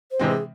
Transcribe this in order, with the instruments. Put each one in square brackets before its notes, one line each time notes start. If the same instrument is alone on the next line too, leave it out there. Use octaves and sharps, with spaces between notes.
[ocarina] C5
[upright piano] C3 E3 G#3 C4
[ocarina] G#4